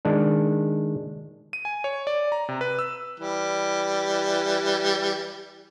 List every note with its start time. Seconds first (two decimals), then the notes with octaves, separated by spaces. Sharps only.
0.05 D#3 G#3 D4
1.53 D#7
1.65 G#5
1.84 C#5
2.07 D5
2.32 A#5
2.49 C3
2.61 B4
2.79 E6
3.20 E3 G3